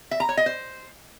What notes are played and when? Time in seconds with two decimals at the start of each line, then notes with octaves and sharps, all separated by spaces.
0.11 E5
0.20 A#5
0.29 C#5
0.37 D#5
0.46 C5